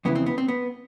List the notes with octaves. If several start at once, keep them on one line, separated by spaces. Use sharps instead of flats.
F2 C#3 E3 B3
C4
B3
C4
B3